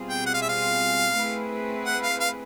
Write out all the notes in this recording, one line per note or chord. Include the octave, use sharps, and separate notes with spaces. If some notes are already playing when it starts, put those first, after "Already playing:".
Already playing: B2 G3 C4 F4 G#4
G5
F#5
F5
E5
F5
A3 C4 E4 G#4 B4
F#5
F5
F5